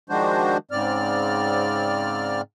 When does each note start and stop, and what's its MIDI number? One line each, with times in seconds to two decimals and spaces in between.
0.10 0.57 51
0.10 0.57 53
0.10 0.57 56
0.10 0.57 62
0.10 0.57 66
0.10 0.57 72
0.71 2.41 44
0.71 2.41 49
0.71 2.41 60
0.71 2.41 74
0.71 2.41 89